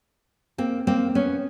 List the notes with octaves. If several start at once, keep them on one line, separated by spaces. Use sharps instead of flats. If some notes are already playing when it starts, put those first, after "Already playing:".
A#3 C4
A#3 C4
B3 C#4